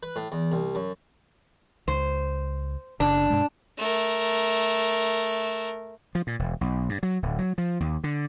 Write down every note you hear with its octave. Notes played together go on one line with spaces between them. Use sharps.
B4
A2
E2
C2
F#2
C#2 C5
F#1 C#3 D4
G2 B2 G#3
A3 A#4
F3
A#2
E1
B1
G2
F#3
D1
F#3
F3
D#2
D3